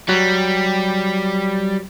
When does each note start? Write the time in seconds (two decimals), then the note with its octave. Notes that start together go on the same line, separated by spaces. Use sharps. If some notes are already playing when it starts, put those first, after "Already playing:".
0.09 F#3 G3